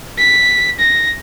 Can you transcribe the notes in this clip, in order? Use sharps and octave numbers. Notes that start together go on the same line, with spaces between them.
B6
A#6